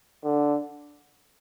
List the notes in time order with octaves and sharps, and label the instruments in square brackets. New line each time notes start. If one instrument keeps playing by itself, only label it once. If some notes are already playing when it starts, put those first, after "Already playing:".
[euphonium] D3